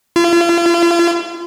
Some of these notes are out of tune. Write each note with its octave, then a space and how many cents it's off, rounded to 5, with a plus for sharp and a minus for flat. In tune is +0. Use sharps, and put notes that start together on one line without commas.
F4 -40